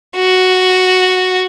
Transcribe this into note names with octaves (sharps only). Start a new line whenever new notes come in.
F#4